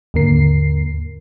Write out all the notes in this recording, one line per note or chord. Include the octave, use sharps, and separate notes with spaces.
D#2 G#2 D3 A#3 A#4 C7